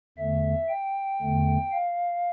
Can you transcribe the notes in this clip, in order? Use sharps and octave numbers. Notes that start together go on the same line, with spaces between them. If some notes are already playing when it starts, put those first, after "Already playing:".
E2 D3 A3 E5
G5
E2 D3 A3
F5